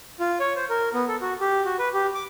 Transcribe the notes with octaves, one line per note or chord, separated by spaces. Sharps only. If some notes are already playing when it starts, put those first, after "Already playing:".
F4
C#5
C5
A#4
B3
A4
F#4
G4
F#4
B4
G4
D6